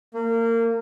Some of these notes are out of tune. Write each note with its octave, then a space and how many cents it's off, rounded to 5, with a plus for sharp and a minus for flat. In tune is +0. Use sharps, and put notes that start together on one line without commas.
A#3 -25